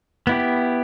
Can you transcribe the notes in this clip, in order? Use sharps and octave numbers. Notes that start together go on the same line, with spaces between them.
B3 E4 G4